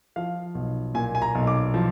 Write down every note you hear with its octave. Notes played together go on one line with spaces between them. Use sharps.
F3 F5
B1
A#2 G#5
G#5
A#5
B1
D6
F3